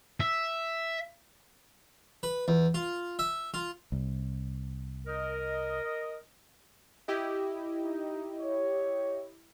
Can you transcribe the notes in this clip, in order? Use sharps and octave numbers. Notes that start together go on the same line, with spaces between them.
E5
B4
E2
F4
E5
F4
C2
A#4 D#5
E4 G4 D#5
D#4
C#5